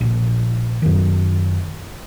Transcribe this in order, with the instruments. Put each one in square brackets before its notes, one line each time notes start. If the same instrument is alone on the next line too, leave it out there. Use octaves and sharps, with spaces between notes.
[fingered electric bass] A#1
F#2 D#3